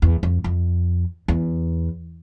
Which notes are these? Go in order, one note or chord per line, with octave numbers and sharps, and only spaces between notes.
E2
F2
F2
E2